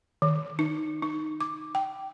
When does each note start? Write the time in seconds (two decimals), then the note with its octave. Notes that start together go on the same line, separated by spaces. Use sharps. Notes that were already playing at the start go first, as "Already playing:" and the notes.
0.22 D#3
0.59 D#4
1.03 D#4
1.41 D6
1.75 G5